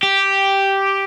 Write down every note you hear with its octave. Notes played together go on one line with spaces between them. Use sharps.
G4